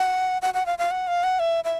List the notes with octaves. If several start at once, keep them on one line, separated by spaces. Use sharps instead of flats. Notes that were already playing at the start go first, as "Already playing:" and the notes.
Already playing: F#5
F#5
F#5
F5
F5
F#5
F5
F#5
E5
E5